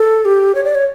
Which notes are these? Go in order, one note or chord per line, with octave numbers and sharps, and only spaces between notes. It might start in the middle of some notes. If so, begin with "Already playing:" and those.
Already playing: A4
G4
C#5
D5
C#5